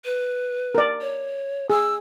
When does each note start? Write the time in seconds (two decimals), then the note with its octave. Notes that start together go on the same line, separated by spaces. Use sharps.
0.05 B4
0.75 A#4 D5
1.01 C#5
1.70 G#4 E6